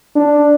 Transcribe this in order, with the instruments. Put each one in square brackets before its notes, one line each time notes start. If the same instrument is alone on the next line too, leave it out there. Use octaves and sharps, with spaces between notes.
[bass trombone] D4